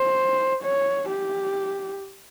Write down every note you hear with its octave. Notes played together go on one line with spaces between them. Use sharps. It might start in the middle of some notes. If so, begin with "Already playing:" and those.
Already playing: C5
C#5
G4